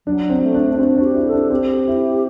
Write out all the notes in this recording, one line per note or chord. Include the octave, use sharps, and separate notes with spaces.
F#3 D4
C4
A3
D4
D4
C4 F#4
D4
G4
E4
A4
D4
C4 G4
E4